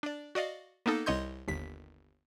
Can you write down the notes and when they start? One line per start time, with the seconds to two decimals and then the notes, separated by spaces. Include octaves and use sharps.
0.03 D4 D5
0.35 F#4 D5 D#5 F5
0.86 A#3 B3 D#4 A4
1.06 C2 C#5 D#5 C6 G6
1.48 G1 D#2 B6